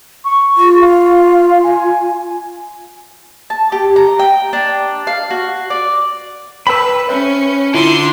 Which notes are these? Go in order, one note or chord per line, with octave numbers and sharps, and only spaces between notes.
C#6
F4
F5
G#5
A5
G4
A#5
G5
D4
F5
F#4
D5
B4 C#5 G5 A5 B5 E6
C#4 C5 C#5 E5
D3 E4 F4 E5 C6